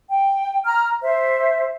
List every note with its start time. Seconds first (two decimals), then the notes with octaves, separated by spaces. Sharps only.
0.09 G5
0.65 A#5 F6
1.03 C5 E5